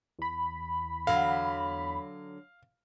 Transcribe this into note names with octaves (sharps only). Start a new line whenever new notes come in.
E2 B5
D3 F#3 F5